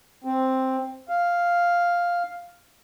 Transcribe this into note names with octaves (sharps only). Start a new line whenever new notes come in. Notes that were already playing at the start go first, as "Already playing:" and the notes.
C4
F5